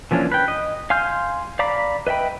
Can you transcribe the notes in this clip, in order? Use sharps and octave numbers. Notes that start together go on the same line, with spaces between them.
E3 F3 A#3 C#4 D4
B4 G5
D#5
F5 G#5 C6 F6 G6
D5 F5 A#5 B5 D6
B4 D#5 E5 G5 B5